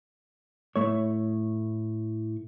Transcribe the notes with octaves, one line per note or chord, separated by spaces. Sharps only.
A2 A3 C#5